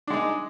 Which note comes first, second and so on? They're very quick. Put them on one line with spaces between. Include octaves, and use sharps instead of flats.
D4 G#3 D#4